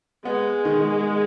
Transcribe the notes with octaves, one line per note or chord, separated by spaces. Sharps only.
G#3 B3
D#3